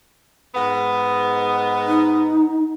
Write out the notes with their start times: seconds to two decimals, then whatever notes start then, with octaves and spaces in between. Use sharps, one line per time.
0.54 G#2 B3
1.87 D#4